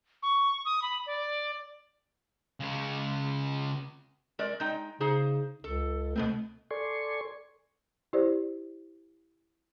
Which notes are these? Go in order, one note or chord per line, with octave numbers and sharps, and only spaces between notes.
C#6
D#6
B5
D5
C#3 G#3
G#3 A#4 D5
G#3 D#4 G5
C#3 D#4 G#4 C5
C#2 A4
B2 A3 B3 C4
A4 D5 G#5 C6 C#6
E4 G4 C5 D5